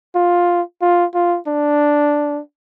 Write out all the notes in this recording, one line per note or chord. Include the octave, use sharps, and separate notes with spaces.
F4
F4
F4
D4